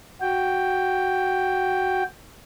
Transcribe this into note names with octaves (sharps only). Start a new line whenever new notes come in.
F#4 G5